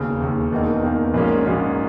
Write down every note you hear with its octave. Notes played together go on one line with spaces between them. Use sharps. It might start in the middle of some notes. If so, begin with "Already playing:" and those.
Already playing: E1 D#2 C#3
E1 D#2 C#3
E1 E2 D#3 A#3 D#4
E1 E2 D#3 A#3 D#4
A#1 G#2 F#3 A#3 C#4
A#1 G#2 F#3 A#3 C#4